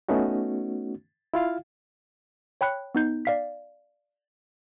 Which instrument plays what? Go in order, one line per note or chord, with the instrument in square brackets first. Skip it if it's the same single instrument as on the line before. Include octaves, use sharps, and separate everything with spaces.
[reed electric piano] A3 B3 C#4 D#4 F#4
E4 F4 F5
[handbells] C#5 G5 B5 F#6 C#7
B3 D#4 G6
D5 F5 B6